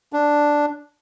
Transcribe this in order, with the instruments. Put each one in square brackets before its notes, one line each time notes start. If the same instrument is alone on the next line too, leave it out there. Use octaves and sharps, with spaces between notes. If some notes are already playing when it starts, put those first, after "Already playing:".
[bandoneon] D4